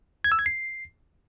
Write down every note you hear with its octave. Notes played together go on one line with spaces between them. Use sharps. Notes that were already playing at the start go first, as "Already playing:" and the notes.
G#6
E6
G#6
C7